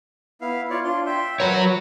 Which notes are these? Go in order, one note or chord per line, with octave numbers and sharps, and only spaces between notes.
B3 E4 F5
F4 C#5 D5
D4 F4 C6
E5 G5 C6
F#3 A#4 B4 C#5 F#5